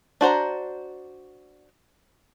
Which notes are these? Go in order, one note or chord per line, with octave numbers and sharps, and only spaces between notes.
D4 F#4 C5 A#5